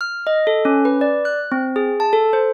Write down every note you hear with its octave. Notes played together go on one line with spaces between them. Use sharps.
F6
D#5
A4
C#4
B4
D5
F#6
C4
G#4
A5
A4
C5